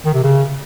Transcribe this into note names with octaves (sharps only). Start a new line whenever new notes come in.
D#3
C3
C#3